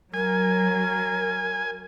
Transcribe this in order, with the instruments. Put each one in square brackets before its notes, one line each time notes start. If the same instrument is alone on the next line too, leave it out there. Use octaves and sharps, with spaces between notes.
[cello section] F#3 [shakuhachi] A#4 [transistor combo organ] G#5